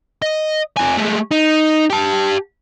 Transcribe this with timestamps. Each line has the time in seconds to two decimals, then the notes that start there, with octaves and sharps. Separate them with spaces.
0.22 D#5
0.77 F2 G#5
0.97 G#3 A3
1.31 D#4
1.90 G4 A5